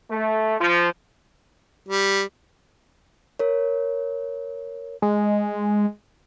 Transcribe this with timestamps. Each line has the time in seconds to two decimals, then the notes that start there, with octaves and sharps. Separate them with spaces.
0.11 A3
0.60 F3
1.88 G3
3.39 A#4 C#5
5.02 G#3